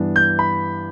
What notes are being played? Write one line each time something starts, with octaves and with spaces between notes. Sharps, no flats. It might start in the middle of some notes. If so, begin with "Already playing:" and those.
Already playing: G2 E3 B3 D4
G6
B5